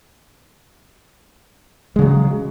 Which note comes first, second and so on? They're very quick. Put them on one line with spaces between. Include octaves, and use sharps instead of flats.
G#3 C#3 F#3